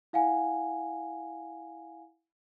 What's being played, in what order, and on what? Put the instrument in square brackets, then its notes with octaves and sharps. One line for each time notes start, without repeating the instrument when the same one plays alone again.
[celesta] E4 F5 F#5 G#5